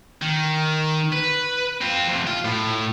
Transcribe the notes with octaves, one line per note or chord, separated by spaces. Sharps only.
D#3
B4
C4 F4
F2 C3
F4
A2